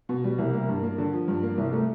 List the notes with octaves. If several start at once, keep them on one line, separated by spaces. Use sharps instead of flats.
B2
G3
C2
A#3
G2
A#3
D3
F3
G2
A#3
C2
A3